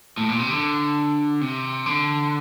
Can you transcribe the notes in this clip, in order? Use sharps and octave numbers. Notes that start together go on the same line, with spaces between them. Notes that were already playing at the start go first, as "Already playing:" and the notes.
A2
A#2
C3
D3
C3
D3